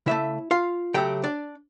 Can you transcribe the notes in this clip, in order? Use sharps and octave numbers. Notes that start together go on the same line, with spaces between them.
C#3 F#3 A3 E4 E5
F4 F5
C#3 F#3 A3 G4 G5
D4 D5